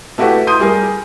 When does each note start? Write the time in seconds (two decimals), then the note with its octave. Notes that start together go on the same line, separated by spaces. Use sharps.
0.18 A3 E4 F#4 G4 B4 F#5
0.47 E4 C6 D#6 G6 D#7
0.60 G3 G#4 A#4